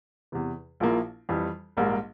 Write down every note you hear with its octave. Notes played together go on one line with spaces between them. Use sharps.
E2 C3 E3
A#1 A#2 F3 A#3 E4
F2 E3 G3
A#1 G#2 G3 A#3